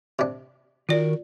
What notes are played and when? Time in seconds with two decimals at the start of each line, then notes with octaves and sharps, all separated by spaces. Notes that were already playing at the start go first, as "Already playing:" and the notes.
0.19 C3 D4
0.89 D#3 F4 F#4 A#4 D5